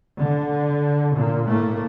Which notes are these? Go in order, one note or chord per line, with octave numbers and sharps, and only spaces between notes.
D3
A#2 A#3
A2 A3 A#3